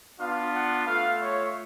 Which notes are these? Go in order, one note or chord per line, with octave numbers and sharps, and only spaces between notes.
B3 D4 F4 F5
F#5
A3 F4 F5
C#5